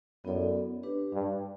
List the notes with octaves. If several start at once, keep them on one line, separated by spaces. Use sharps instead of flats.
F#2 B3 E4 A4 D5
D4 G4 B4
G2